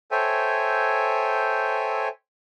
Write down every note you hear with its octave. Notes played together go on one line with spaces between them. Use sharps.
A4 C5 C#5 E5 G5 G#5